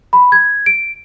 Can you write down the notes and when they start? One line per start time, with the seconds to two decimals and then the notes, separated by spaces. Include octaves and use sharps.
0.13 B5
0.32 G#6
0.66 D7